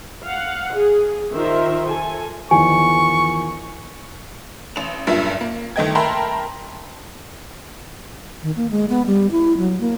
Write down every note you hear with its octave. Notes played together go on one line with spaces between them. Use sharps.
F5 F#5
G#4
D#3 F4 G4 A#4 C5 E5
A4 G#5
E2 D#3 F3 G#5 C#6
A1 E7 F7
F#1 G2 A#2 E5
A#3
G1 D#3 A3 D#5 G5 G#6
A#4 E5 G5 A5 B5 C6
D#3
A#3
G#3
B3
G3
E4
F#3
A#3